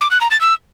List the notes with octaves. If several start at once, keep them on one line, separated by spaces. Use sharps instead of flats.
D6
F#6
A#5
A6
E6